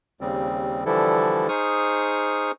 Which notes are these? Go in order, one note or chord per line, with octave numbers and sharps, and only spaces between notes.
D#2 C#3 G3 C4
D3 E3 F3 G3 E4 A4
D#4 G#4 C5 C#6 D#6 F6